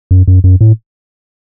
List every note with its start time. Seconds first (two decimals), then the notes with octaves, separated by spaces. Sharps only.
0.11 F#2
0.28 F#2
0.44 F#2
0.61 A2